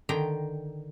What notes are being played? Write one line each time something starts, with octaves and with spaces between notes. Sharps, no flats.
D3 D#3 G5 A#5